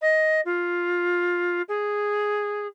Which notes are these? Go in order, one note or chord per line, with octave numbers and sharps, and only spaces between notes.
D#5
F4
G#4